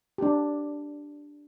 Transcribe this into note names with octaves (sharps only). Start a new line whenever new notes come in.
D4 G4